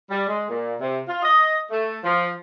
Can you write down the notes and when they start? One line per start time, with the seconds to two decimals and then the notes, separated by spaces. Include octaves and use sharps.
0.11 G3
0.28 G#3
0.50 A#2
0.81 C3
1.08 F4
1.23 D#5
1.71 A3
2.04 F3